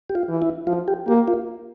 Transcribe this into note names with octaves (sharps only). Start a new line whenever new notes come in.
G4
F4
E3
E4
F3 F4
G4
A#3 G4
F4